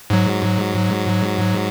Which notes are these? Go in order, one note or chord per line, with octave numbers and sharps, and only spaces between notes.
G#2 F#3